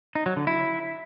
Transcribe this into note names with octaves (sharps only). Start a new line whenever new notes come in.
D#4
F#3
D3
E4